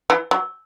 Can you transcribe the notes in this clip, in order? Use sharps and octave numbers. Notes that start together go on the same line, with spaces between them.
E3
F#3